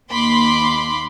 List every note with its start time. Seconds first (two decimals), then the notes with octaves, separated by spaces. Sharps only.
0.10 D#2 A#3 B5 C6 D6